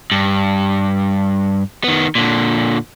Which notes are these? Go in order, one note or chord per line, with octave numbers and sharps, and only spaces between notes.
G2
D#3 B3
A#2 D3